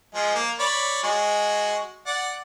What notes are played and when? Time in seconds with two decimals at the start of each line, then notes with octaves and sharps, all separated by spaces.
0.15 F3 G#3
0.35 A#3
0.59 C#5 D5 B5
1.03 G#3 F#4
2.06 D5 F#5